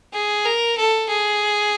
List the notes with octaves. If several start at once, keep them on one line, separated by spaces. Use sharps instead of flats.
G#4
A#4
A4
G#4